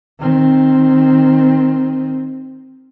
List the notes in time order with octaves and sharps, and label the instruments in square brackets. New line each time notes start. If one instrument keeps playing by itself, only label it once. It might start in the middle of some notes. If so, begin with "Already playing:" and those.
[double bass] D#3 C4